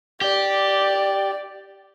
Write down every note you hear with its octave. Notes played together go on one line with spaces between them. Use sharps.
G4 D5